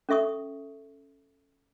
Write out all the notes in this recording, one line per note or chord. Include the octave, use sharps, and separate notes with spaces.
C#4 A4 E5 C#6 D#6